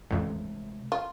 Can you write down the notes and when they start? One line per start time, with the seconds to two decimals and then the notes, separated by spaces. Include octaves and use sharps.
0.10 A1 F2 C3 G#3 A3
0.92 F4